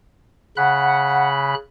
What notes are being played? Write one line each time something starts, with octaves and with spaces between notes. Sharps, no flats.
C#3 F#5 B5 F#6